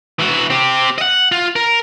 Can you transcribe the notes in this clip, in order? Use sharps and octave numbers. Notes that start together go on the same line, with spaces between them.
E3 F#4
C4 G4
D#5 F#5
F4
A#4